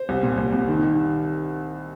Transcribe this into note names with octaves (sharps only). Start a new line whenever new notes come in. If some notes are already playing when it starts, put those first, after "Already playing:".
Already playing: C5
C2
A#2
C2
C2
D#3
D#3